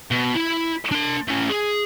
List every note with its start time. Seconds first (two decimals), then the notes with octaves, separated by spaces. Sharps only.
0.11 B2
0.35 E4 B5
0.91 D4 C6
1.28 A3 C#4
1.50 G#4